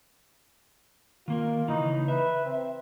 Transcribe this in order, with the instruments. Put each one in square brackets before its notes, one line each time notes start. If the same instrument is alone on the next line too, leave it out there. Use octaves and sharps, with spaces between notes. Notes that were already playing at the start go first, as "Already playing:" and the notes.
[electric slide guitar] D#3 A#3 A#4 [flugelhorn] F4
[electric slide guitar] C#3 E3 [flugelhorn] D#4
[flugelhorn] B4 [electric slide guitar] E5
[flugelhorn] C4